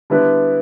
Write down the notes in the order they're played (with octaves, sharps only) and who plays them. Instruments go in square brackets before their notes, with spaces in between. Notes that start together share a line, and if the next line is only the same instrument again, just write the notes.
[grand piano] D3 G3 B3 E4 B4